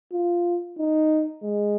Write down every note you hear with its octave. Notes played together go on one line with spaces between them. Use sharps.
F4
D#4
G#3